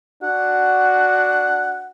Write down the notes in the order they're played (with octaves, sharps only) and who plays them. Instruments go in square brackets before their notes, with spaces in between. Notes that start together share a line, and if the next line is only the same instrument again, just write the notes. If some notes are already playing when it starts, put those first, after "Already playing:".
[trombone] D4 [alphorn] F#4 [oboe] F#5